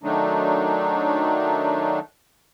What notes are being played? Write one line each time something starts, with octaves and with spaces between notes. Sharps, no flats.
D#3 F#3 A3 D4 D#4